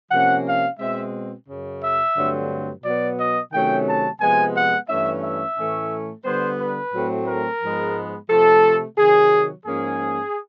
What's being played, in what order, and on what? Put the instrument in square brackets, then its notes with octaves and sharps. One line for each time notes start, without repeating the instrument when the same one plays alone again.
[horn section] C3 F3 A#3 C#4 F#5
F5
B2 G#3 C4 E5
F#2 C#3 F#3
E5
G2 D3 F#3 A3 C4
B2 F#3 B3 D5
D#5
C3 D#3 F#3 A3 C#4 G5
A5
C3 F3 G#3 B3 G#5
F#5
G2 E3 A3 C#4 E5
E5
A2 E3 A3 C#4
D3 G3 B3 C5
B4
A2 F#3 A3 C4
A#4
G#2 F3 G#3 B3
C3 F3 A3 A4
C3 D#3 F#3 G#4
G#2 F3 A#3 C#4 G#4